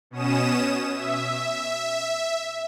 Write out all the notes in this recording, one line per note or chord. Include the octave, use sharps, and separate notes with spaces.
B2 C#4 D#6 E7
E5